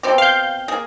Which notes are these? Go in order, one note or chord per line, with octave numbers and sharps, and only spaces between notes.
B2 C4 G4
F5 G6
A#3 G#4